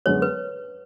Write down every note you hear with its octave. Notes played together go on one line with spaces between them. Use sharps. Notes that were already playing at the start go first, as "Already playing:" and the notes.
F#2 D3 G#3 B3 F#4 C#5
B4